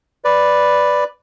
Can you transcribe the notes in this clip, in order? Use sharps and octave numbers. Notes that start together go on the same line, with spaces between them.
B4 D5